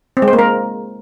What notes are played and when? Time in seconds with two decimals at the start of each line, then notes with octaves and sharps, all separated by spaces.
0.17 C4
0.22 G#3
0.28 C5
0.33 A#3
0.39 A#4